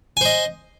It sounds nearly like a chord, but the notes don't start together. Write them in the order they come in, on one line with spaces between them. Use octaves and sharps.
G#5 C5 D#5